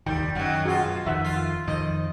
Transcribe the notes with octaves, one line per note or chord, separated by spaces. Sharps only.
F1 D#2 D#3 G3 G5
F#2 D#3 F#3
B2 F4 F#4 G#4
F2 D#3 E5 F#5
F4
F2 D#3 D#5